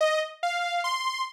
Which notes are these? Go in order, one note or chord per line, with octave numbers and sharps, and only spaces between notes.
D#5
F5
C6